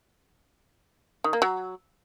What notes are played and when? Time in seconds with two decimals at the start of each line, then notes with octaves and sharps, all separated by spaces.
1.24 D#3
1.33 A#3
1.42 F#3